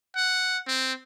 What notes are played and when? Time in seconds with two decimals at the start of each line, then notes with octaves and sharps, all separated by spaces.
0.16 F#5
0.67 C4